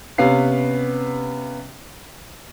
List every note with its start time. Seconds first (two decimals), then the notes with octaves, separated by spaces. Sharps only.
0.18 C3 B3 C#4 B4 F5 C7